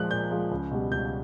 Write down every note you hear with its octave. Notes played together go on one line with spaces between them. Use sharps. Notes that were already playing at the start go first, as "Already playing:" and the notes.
Already playing: A#2 F3 G#3 F#6
A#2 G6
F3 G#3
C#2
B2 G3
C#2 G6